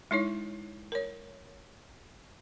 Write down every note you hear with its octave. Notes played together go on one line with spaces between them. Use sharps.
G#3 D#4 E4 C#5
A#4 C#5